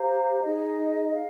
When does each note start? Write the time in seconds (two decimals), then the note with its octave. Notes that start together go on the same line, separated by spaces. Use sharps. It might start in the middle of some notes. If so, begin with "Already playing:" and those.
Already playing: G4 C5 F5 A#5
0.41 D#4 G#4 D#5
1.15 F5